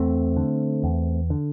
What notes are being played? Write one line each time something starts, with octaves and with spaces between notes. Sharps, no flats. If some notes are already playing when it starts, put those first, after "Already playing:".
Already playing: E2 A3 C4
D3
E2
D3